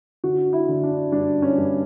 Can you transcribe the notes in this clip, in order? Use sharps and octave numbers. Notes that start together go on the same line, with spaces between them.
D3 F#4
E4
D3
D4
G2 D4
C#4
G2